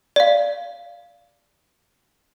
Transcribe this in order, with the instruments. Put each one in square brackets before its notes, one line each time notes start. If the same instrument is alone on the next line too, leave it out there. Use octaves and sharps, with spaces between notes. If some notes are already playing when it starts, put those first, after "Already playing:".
[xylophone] D5 F5